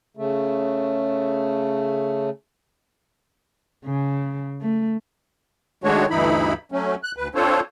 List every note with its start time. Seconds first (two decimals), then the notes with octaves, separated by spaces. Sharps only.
0.17 C#3 A3
3.85 C#3
4.60 A3
5.84 D#3 G#3 A3 D4 F#4 C#5
6.10 D2 G2 E3 D#4 E4 B5
6.72 F#3 A3 C#4
7.03 F#6
7.17 D2 B4
7.35 C4 D4 F4 A4 C5 C#5